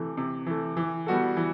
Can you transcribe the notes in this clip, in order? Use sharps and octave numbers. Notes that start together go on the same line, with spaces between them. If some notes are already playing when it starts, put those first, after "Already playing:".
Already playing: C3 E3 A3
C3
E3 A3
E3
G3 B3 F#4 A4
E3